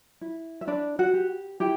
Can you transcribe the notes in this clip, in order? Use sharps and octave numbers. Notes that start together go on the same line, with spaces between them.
E4
E5
D4 B4 D5
F#4 F#5
G4
E4 G4 G5